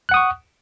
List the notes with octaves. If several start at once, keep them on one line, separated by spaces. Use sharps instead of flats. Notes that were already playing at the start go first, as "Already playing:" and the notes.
F#5 C#6 D#6 F#6